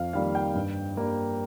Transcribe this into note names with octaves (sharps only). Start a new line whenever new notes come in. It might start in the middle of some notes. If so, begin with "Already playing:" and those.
Already playing: F2 F5
D#3 G3 A#3 F5
G5
G2
G3 A#3